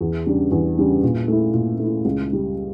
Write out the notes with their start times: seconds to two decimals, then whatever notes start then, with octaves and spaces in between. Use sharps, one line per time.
0.01 E2
0.26 C#3 G3 D4
0.51 E2
0.77 C#3 G3 D4
1.03 A#2
1.28 A3 E4
1.53 A#2
1.80 A3 E4
2.05 C#2
2.31 C#3 G3